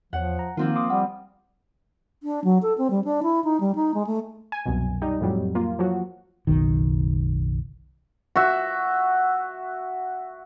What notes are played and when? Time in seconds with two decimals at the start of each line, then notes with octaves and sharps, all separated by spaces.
0.13 E2 F3 C#5 F#5
0.39 A#5
0.57 D#3 F3 A#3 C4 F4
0.76 C6 D6 D#6
0.90 G3 F#5
2.23 D4
2.44 F#3
2.62 A4
2.78 C4
2.90 G3
3.04 D4
3.23 E4
3.44 D#4
3.60 G3
3.75 D#4
3.94 G#3
4.07 A3
4.52 G#5
4.66 C2 F#2 B2
5.02 G3 D#4
5.21 F2 A2 F#3 G3
5.55 A#3 F4
5.79 F3 F#3 F#4
6.47 F#1 B1 D#3
8.36 F#4 E5